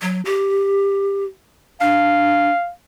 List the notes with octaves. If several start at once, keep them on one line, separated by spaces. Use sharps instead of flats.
F#3
G4
D4 F5